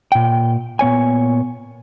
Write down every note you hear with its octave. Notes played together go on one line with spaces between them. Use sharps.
A#2 G5
A#2 B3 C#5 G#5